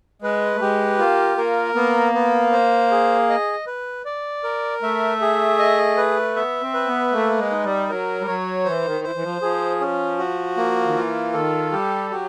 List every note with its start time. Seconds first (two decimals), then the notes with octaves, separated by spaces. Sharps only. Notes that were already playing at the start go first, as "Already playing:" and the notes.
0.22 G#3 B4
0.55 A3
0.60 G#3 G4
0.98 A#3 F4
1.37 A#3 A#4
1.75 A#3 B3
2.14 B3
2.52 C5
2.91 G#4
3.29 D#5
3.67 B4
4.05 D5
4.44 A#4
4.82 A3 E5
5.21 G#4
5.59 D#5
5.97 B4
6.35 B3 E5
6.62 C4
6.74 B4
6.87 B3
7.13 A3 A#3
7.38 G#3
7.51 D#4
7.64 G3
7.89 F#3 A#4
8.21 G3
8.27 F#3 C#5
8.65 E3 C5
8.85 D#3
9.04 E3 C5
9.15 E3
9.23 F3
9.42 F3 G#4
9.81 C#4
10.18 F#4
10.57 A#3
10.86 D#3
10.95 E3 F4
11.33 D#3 A4
11.72 G3 G4
12.10 F#3 G4